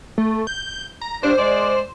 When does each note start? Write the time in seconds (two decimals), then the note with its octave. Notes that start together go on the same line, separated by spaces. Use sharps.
0.18 A3
0.47 G6
1.01 A#5
1.23 G2 D4 C5
1.38 G#3 D5